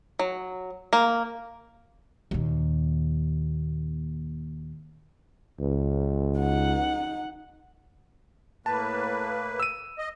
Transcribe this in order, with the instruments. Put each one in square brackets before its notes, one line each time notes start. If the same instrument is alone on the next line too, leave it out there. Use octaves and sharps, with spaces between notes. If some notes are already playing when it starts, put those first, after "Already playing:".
[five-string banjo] F#3
A#3
[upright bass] D#2 A#2
[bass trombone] C#2
[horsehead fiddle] D#4 F#5
[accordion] A2 A#3 B4 [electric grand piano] A5
[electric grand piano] E6 D#7
[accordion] D#5